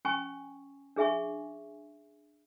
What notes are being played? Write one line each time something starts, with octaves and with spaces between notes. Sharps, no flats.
C#4 G5 G#5 C#6
D4 G#4 E5 G#5 C#6